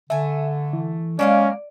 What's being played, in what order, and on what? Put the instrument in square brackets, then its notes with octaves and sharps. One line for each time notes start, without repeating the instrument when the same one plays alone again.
[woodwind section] D3 [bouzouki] A3 G#5 [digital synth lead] E5
[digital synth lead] E3
[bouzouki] F#3 A#3 F5 [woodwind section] G#3 [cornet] C#4 [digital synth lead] D5